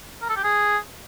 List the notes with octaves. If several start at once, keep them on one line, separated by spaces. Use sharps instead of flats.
A#4
A4
G4
G#4